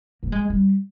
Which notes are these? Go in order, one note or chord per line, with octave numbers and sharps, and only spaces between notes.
A#3
G#3
G3